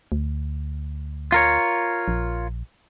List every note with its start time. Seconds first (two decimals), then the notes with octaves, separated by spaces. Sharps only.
0.12 D2
1.32 F4 A#4 C#5
2.08 A#1